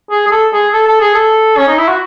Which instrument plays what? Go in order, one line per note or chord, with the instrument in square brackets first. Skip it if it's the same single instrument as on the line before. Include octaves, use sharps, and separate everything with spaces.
[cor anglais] G#4
G#4
A4
G#4
A4
A4
G#4
A4
C#4
D#4
E4
F#4